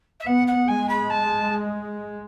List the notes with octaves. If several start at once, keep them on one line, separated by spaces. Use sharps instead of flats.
E5
B3 F#5
F#5
G#3 G#5
B5
A5